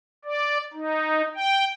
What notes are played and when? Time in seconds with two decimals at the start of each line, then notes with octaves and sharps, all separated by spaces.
0.25 D5
0.74 D#4
1.35 G5